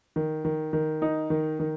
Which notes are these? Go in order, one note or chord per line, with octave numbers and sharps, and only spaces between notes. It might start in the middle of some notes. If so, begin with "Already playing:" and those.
D#3
D#3
D#3
D#4
D#3
D#3